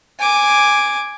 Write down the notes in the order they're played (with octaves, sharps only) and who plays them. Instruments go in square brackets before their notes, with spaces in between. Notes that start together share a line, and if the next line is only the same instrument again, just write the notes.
[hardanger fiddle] G#5 D6